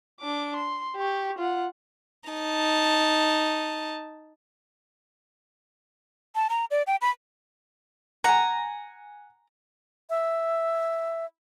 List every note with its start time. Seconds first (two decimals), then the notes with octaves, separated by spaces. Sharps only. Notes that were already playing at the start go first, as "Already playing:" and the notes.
0.20 D4 D6
0.56 C6
0.96 G4 C#6
1.38 F4 F#5
2.29 D#4 A5
6.35 A5
6.50 A#5
6.71 D5
6.87 G5
7.01 B5
8.24 F#5 G#5 A#5
10.10 E5